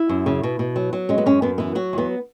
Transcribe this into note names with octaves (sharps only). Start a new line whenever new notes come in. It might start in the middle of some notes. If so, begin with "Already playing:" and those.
Already playing: E4
F#2
C#3
B2
B2
F#3
F#3
G#3 C#4
B3
F#2 C#4
F#2 B3
E3 B3
F#3 F#4
E2 B3